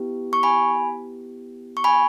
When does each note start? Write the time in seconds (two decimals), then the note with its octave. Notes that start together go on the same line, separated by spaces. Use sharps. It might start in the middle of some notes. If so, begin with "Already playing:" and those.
Already playing: B3 E4 G4
0.33 C#6
0.43 G#5 B5
1.77 C#6
1.84 G#5 B5